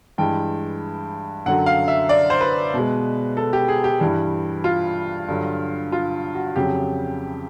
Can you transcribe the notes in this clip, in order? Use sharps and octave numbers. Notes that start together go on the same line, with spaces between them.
G2 E3 G#3 G5
F#2 D3 F#3 F#5
F5
E5
D5
C5
B4
B2 G#3
A4
G4
G#4
G4
G2 E3 G3
F4
G2 D3 F#3
F4
F#4
F2 C#3 F#3 G4